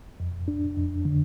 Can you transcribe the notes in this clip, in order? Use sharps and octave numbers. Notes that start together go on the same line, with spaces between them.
F2
D4
F2
D3